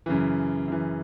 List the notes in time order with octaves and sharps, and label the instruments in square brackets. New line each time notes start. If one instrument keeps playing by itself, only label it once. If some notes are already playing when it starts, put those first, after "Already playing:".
[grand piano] F#2 C#3 E3
F#2 C#3 E3